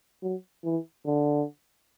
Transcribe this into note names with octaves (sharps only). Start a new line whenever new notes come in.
F#3
E3
D3